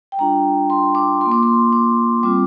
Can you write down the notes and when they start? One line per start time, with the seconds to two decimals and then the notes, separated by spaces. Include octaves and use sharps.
0.12 G5
0.18 G3 D4 F4 A#5
0.70 C6
0.95 D6
1.21 A#3 F4 C6
1.32 D6
1.43 C6
1.73 D6
2.23 G3 C4 F4 D6